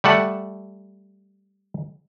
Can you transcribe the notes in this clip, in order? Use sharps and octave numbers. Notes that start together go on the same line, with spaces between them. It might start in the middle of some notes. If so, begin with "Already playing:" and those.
G3 A3 F#5 A5